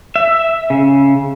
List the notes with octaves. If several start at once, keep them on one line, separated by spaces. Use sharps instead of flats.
E5
C#3